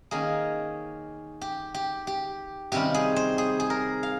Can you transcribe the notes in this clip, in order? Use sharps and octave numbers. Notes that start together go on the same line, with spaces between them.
D#3 A#3 C#4 G#4
G4
G4
G4
C3 D#3 G3 C#4 F4 G4
G#4
C5
G#4
G#4
A#4
F5